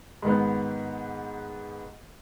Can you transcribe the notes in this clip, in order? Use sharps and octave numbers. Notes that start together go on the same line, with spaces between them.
G#2 D#3 B3